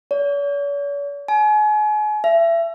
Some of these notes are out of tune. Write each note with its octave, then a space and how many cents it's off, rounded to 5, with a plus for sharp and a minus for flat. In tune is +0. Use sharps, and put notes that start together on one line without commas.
C#5 +45
G#5 +35
E5 +30